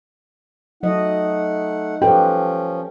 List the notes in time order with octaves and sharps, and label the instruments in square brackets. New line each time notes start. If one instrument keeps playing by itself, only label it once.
[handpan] F#3 D#5 [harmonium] A3 F#5 [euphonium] D#4
[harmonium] F3 C#4 [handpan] G4 A4 B4 [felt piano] G5